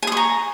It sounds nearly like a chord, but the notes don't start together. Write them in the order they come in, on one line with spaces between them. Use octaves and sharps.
G#5 D#6 C#6 A#5